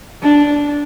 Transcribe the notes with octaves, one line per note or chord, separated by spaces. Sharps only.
D4